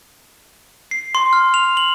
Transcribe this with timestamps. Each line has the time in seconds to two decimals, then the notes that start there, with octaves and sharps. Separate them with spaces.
0.91 C7
1.15 C6
1.33 F6
1.54 F7
1.77 F#7